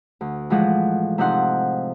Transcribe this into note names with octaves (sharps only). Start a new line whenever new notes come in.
D2
A2 E3 F3 G#3 F#5
C3 F3 C4 D#4 F#5 C6